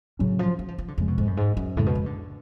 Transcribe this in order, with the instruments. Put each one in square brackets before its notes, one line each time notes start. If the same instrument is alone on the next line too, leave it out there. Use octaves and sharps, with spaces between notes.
[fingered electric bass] A2 F#3 C#4 [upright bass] C#3
[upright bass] F3
F#3
F3
F3
D3
[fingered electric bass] F2 F3 G#3 [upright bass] C#3
[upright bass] B2
G#2
F#2
G#2
F#2
[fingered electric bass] F2 C#3 G#3 [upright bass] A2
[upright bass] B2
F3
D3